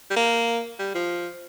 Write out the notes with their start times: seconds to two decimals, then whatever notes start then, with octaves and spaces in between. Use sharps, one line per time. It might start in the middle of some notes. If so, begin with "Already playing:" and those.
0.11 G3
0.16 A#3
0.79 G3
0.95 F3